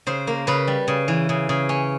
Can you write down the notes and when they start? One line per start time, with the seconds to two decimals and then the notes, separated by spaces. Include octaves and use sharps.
0.07 C#3 C5
0.27 A#3
0.47 C#3 B4
0.67 G3
0.88 C#3
1.08 E3
1.29 C#3
1.49 C#3
1.69 C#4